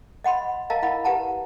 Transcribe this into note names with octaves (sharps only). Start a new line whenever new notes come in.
D#5 F#5 B5 C6
A#4 D#5 F5 A5 A#5
E4 F#5 B5
G4 B4 F#5 A5 A#5